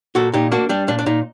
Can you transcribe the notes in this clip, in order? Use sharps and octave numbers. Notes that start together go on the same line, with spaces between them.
A#2 F#4 A4
A#2 D#4 G4
A#3 D4 F#4
G3 D4
A#2 D4
D4
A#2 D#4